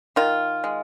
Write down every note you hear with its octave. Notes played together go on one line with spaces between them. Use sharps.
D#3 F4
G#3